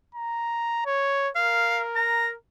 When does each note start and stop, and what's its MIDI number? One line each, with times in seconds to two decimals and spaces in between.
0.15 0.84 82
0.86 1.30 73
1.36 2.37 70
1.36 1.82 77
1.96 2.29 82